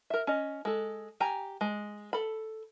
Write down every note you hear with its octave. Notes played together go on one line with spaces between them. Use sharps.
A#4 E5
C#4 D#5
G#3 A4
G4 G5 G#5 A#5
G#3
A4 B5